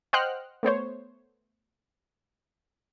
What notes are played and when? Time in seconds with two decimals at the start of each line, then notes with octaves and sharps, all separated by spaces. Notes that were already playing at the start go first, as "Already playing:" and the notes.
0.13 C5 D#5 F#5 G5 F6 F#6
0.63 A3 B3 C5 C#5